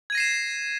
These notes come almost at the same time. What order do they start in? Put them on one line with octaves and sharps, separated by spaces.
G#6 D#7 A#6 C7 E7